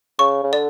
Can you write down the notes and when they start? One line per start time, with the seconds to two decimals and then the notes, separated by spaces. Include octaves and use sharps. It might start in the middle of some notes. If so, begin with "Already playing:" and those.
0.19 C#3 C#6
0.43 C#3
0.53 D3 D5